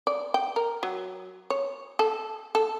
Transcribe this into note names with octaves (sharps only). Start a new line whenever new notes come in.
D5
G5
A#4
F#3
C#5
A4
A4